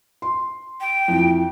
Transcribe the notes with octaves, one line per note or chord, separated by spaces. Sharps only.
C6
G5
F2 E3